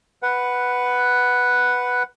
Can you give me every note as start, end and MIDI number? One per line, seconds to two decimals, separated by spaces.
0.23 2.03 71
0.23 2.03 78